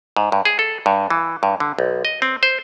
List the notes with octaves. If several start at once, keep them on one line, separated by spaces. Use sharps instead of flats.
G#2
G2
G#4
A4
G2
E3
G2
D3
B1
D#5
C4
C5